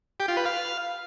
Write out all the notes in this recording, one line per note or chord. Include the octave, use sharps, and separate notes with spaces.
G4
F4
B4
F5